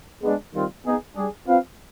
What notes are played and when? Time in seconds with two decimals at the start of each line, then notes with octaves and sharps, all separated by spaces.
0.23 G#3 B3 D4
0.53 D#3 G3 C4 F4
0.85 B3 D#4 G#4
1.16 G3 D4 G#4
1.47 C4 F4 B4 F5